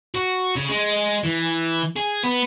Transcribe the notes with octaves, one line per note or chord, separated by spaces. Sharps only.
F#4
C#3
G#3
E3
G#4
B3